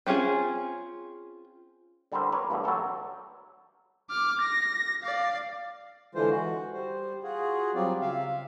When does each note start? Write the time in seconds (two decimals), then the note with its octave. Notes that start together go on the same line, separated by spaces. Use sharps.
0.07 C4 C#4 F4 G#4
2.12 D3 G3 A4 A#4 C5
2.32 A#4 B4 C#5 D5
2.50 A1 G2 B2 E3
2.64 F#3 G4 A4 A#4
4.10 D6 F6
4.41 A#6
5.03 D5 F5
6.15 D3 E3 G#3 F4 C5
6.30 F#4
6.73 G3 C5
7.23 F4 F#4 G#4
7.75 F#3 G3 C4 F4 D5
8.01 C#3 E5 F5